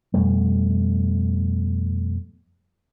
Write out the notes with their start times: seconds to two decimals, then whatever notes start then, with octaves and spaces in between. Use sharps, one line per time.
0.14 F2 B2 G3 A3